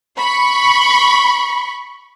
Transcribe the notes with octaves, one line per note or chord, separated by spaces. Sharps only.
B5 C#6